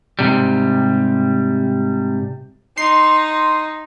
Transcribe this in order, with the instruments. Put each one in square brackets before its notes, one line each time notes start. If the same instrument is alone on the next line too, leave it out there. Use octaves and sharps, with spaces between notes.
[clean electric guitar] G#2 C3 G3
[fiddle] D#4 [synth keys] C6